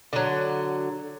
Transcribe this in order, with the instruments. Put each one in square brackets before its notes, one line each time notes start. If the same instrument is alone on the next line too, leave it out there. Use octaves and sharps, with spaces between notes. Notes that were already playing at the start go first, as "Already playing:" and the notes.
[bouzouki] D3 F#3